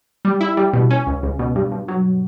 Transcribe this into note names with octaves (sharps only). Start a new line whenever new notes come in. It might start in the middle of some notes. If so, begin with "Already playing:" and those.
G3
E4
G3
B2
C#4
C#2
C#2
B2
G2
G2
F#3